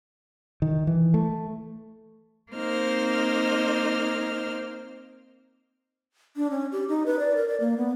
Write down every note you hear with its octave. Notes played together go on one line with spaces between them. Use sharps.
D#3
E3
A3
A#3 C4 D#4 C5 F6
D4
C#4
G4
D#4
B4
D5
A#4
D5
A#3
B3